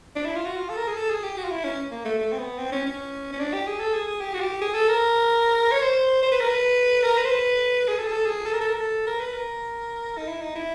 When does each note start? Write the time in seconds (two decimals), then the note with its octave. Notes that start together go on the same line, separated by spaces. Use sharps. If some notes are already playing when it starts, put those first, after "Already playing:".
0.16 D4
0.25 E4
0.36 F4
0.46 F#4
0.57 F4
0.70 A4
0.77 A#4
0.88 G#4
0.97 A4
1.10 G#4
1.24 G4
1.37 F#4
1.44 F4
1.51 E4
1.64 C#4
1.91 A#3
2.05 A3
2.19 A3
2.32 C4
2.38 B3
2.58 C4
2.72 C#4
2.86 C#4
3.33 C#4
3.40 D4
3.53 G4
3.67 G#4
3.80 A4
3.94 G#4
4.07 G#4
4.21 G4
4.34 F#4
4.41 G4
4.62 G#4
4.75 A4
4.89 A#4
5.72 C#5
5.82 C5
6.23 C5
6.32 B4
6.41 A#4
6.50 B4
7.04 A#4
7.18 B4
7.25 C5
7.31 B4
7.88 G#4
7.99 A4
8.07 G#4
8.12 A4
8.26 G#4
8.46 A4
8.53 A#4
8.61 A4
8.68 A#4
8.75 A4
9.07 A#4
9.20 B4
9.34 A#4
10.18 D#4
10.28 E4
10.42 D#4
10.55 E4